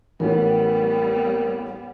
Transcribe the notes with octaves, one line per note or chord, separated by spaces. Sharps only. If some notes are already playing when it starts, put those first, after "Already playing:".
A1 A2 G3 B3 A#4